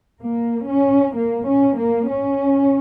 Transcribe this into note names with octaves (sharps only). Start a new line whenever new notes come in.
A#3
C#4
A#3
C#4
A#3
C#4